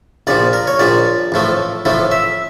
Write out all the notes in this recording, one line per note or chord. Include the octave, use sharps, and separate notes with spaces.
A#1 A#2 F3 D5
A#4
C#5
A#1 A#2 F3 D5
A1 A2 F3 A3
A1 A2 F3 A3
E5